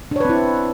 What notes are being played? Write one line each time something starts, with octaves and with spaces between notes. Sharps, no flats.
C4 D4 E4 B4 C#5